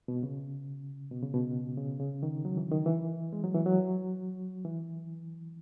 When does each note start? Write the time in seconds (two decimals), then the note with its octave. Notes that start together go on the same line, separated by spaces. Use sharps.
0.08 B2
0.23 C#3
1.11 B2
1.23 C#3
1.34 B2
1.77 C#3
1.99 C#3
2.23 D#3
2.45 F#3
2.57 E3
2.71 D#3
2.86 E3
3.33 G#3
3.44 F#3
3.55 E3
3.66 F#3
4.65 E3